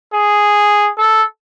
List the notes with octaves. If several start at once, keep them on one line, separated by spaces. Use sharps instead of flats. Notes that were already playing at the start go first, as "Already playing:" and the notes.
G#4
A4